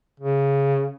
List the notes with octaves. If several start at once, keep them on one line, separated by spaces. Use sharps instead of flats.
C#3